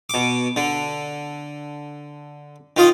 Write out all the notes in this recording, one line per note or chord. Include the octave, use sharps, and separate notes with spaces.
B2 D6
D3
D#3 F4 D#5